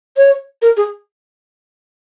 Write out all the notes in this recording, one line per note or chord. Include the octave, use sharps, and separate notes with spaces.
C#5
A#4
G#4